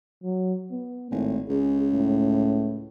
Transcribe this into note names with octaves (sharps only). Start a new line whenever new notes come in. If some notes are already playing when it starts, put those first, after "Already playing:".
F#3
B3
G#1 A2
C#2 G#4
A2